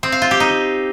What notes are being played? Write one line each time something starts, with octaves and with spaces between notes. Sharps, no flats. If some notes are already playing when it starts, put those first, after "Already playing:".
C4
F5
F4
G4
D#4